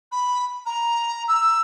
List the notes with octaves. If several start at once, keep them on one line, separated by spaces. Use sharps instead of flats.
B5
A#5
E6